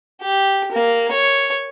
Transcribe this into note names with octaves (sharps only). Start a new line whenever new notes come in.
G4
A#3
C#5